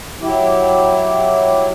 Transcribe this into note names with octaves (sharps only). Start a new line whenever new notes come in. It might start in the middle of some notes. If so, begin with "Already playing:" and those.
F#3 E4 G4